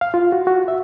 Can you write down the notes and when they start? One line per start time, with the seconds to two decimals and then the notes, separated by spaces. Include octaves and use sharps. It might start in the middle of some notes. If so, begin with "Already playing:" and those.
0.01 F5
0.14 F4
0.32 F#4
0.47 F#4
0.68 E5